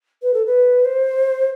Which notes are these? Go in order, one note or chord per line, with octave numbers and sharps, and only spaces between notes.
B4
A4
B4
C5